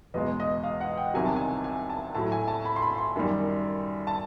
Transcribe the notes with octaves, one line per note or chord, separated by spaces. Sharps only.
E2 B2 G#3 D#5
D#5
F5
F#5
G5
C2 C3 D#3 F#3 G#5
A5
G#5
G#5
A5
A2 F#3 A5
G#5
A5
B5
C6
B5
C6
F#2 D#3 G3
A5